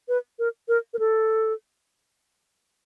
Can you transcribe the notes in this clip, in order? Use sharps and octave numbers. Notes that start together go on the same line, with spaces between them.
B4
A#4
A#4
A#4
A4